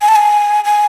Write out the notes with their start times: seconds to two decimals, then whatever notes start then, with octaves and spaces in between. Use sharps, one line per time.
0.02 G#5
0.08 A5
0.16 G#5
0.64 G#5